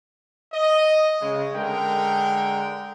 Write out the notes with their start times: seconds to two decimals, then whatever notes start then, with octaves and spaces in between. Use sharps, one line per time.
0.53 D#5
1.20 C#3 G#3
1.54 D3 G#3 A#4 G5